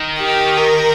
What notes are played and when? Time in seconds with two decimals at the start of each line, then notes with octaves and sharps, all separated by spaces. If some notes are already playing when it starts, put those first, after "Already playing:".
Already playing: D#3
0.19 G4
0.57 A#4